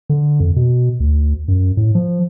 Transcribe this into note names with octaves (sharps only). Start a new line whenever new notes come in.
D3
F2
B2
D2
F#2
A2
F3